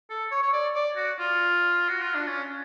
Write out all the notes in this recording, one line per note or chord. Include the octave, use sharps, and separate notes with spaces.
A4
C#5
C#5
D5
D5
F#4
F4
F#4
F4
D4
C#4